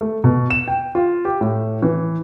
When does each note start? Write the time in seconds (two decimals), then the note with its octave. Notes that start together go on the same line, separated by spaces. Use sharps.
0.01 A3
0.24 B2
0.50 E7
0.68 G5
0.95 F4
1.25 G4
1.41 A2
1.82 E3